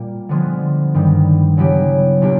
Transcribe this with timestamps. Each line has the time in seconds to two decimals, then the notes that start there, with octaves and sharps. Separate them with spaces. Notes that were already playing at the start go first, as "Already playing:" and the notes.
Already playing: A#2 G3 A#3
0.29 D3 F3 G#3 B3
0.94 G2 D#3 G3
1.57 C#3 F#3 B3 E4 G4
2.21 A#2 F#3 A#3 D4 G4